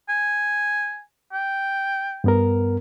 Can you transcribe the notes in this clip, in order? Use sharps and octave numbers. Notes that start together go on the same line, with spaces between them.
G#5
G5
G2 B3 A#4